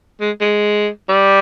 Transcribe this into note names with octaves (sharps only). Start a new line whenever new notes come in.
G#3
G#3
G3